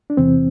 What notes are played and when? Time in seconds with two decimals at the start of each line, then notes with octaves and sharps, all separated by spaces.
0.10 D4
0.17 E2 C3 E3 C4